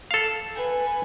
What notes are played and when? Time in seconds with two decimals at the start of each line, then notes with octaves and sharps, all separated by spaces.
0.11 A4 F5
0.54 B4 G#5